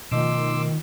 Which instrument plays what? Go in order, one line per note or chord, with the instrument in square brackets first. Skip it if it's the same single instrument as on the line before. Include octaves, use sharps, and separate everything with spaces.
[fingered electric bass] B2 A3 [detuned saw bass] D#3 [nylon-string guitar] F3 D#5 [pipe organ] C6 D6 E6